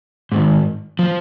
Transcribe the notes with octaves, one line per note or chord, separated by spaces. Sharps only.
G#2 D#3
F3